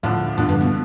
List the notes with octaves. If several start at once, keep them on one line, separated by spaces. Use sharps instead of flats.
D2 A2 D3 F3
D2 A2 D3 F3
G2
B2